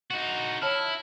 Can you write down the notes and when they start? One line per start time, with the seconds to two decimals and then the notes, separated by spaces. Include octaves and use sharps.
0.11 D#4 F#4
0.62 E4 C#5 A5 F6